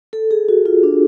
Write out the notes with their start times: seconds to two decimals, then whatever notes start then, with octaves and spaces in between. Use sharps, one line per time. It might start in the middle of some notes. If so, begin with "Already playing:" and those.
0.13 A4
0.31 G#4
0.49 F#4
0.66 F4
0.83 D4